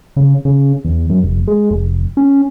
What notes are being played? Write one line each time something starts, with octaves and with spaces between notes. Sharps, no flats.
C#3
C#3
E2
F#2
F1
G#3
F1
C#4